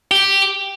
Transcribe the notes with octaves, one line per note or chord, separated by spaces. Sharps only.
G4